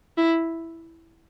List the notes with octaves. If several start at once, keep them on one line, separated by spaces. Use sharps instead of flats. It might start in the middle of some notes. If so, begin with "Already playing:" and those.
E4